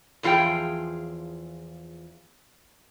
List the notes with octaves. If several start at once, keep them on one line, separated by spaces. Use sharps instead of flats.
E2 F3 F4 G#4 G5